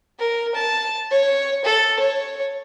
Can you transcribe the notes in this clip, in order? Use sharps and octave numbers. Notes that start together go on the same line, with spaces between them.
A#4
A5
C#5
A4
C#5